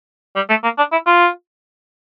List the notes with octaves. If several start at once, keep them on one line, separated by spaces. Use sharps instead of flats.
G3
A3
A#3
D4
E4
F4